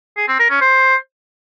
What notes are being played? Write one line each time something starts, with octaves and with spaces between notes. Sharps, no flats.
G#4
C4
A#4
C#4
C5